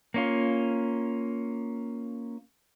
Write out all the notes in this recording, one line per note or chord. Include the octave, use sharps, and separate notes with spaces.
A#3 C#4 F4